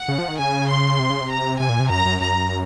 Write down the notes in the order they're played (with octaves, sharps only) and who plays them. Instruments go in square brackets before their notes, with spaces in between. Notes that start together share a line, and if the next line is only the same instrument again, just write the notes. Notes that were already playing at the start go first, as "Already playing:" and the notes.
Already playing: [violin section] F#5
[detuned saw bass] C#3
F3
D#3
[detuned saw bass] C#3 [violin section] G#5
[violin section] C6
[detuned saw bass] C3
C#3
C3
[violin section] A#5
[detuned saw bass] C3 [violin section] G#5
[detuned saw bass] A#2
C3
[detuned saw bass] F#2 [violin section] A#5
[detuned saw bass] F#2
[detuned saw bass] F#2 [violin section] A#5